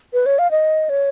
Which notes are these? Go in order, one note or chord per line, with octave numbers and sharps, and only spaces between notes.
B4
C#5
F5
D#5
C#5